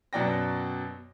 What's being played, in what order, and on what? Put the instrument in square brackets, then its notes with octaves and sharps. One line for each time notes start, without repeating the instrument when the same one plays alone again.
[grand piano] F#2 B2 F#3 D5 G5 A#6